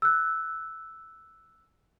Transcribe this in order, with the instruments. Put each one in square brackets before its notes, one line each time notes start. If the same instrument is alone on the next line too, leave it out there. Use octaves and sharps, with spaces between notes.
[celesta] E6 F#6